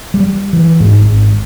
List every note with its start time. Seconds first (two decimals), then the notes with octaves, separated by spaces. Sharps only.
0.14 G3
0.53 E3
0.80 G#2
0.99 G#1